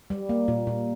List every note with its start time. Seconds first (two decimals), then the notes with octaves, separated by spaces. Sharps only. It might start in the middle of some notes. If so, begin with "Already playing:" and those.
0.10 G3
0.29 A#3
0.48 A#2
0.67 A#2